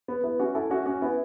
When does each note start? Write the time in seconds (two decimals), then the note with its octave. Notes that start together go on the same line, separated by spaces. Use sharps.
0.08 B3
0.24 B3 E4
0.39 C#4 F#4
0.55 E4 A4
0.70 C#4 F#4
0.86 C#4 F#4
1.02 B3 E4